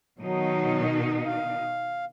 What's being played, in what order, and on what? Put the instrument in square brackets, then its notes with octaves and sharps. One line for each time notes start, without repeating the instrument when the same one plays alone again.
[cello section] B2 D#3 D#4 [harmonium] F#3
[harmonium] F5